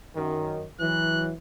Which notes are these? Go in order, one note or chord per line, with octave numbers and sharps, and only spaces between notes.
F#2 D#3
E3 F#3 F#6